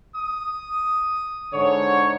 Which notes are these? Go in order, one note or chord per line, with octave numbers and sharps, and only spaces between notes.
D#6
G#2 D3 C#5